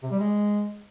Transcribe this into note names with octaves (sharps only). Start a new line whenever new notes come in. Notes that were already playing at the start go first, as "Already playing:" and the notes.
C3
G3
G#3